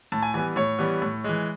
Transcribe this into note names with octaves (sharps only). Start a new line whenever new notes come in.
A2 A5
G#5
E3 G3 B3 G#5
A2 C#5
E3 G3 B3
A2
E3 G#3